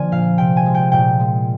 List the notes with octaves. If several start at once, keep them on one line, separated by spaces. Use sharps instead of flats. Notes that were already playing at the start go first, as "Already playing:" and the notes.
Already playing: D3 F3 A#3 D5 G#5
A#2 F5
C3 G5
G#5
G#3
G5
A#2 G5
G#3